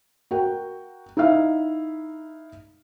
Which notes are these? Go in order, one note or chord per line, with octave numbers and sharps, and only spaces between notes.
F#4 A#4 G5
D#4 E4 E5 F5